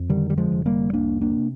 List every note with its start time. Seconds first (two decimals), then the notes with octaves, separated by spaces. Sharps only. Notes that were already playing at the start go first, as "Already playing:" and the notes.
Already playing: F2
0.10 D3 D#3 G3
0.30 G3
0.37 F3 G#3
0.52 F1
0.66 G3 A#3
0.93 C2 A#3 D4
1.21 A#3 D4
1.35 C3